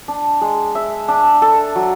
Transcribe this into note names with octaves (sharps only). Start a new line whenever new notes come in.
D4
G#3
E5
D4
A4
F#3